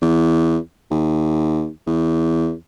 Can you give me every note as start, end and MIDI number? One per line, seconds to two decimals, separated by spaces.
0.02 0.57 40
0.91 1.68 39
1.87 2.53 40